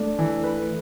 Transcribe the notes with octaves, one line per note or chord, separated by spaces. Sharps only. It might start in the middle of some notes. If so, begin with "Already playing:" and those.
Already playing: A3 D4
E3
B4